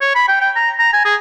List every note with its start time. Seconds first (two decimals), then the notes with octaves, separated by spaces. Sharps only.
0.01 C#5
0.15 B5
0.28 G5
0.41 G5
0.56 A#5
0.79 A#5
0.93 G#5
1.05 G#4